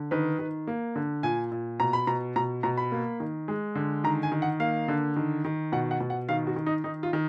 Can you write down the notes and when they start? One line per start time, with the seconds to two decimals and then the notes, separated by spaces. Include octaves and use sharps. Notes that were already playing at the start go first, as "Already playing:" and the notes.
Already playing: D3
0.11 D#3 B4
0.39 D#3
0.67 A#3
0.96 D3
1.23 A#2 G#5
1.52 A#2
1.80 B2 A#5
1.93 B5
2.07 B2 A#5
2.36 B2 A#5
2.63 B2 A#5
2.77 B5
2.92 A#3
3.20 D#3
3.48 G#3
3.75 D3
4.04 D#3 A#5
4.23 G#5
4.32 D#3
4.42 F#5
4.60 A#3 F5
4.88 D3
5.16 D#3
5.45 D#3
5.72 B2 F#5
5.91 F#5
6.00 B2
6.10 F#5
6.29 D#3 F5
6.47 F#4
6.56 D#3
6.66 D#4
6.84 D#3 D#4
7.03 F4
7.13 D#3